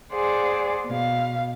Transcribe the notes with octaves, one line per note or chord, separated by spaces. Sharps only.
G#4 C5 D5 F#5 G#5
B2 F5